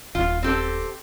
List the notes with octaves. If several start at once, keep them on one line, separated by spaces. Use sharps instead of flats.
D#1 F4
C4 G4 A4